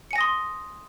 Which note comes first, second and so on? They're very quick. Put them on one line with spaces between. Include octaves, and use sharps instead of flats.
C#7 G#5 A#6 D#6 C6